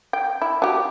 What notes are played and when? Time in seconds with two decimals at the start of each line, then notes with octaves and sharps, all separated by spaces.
0.13 G5
0.42 E4
0.62 F#3 G4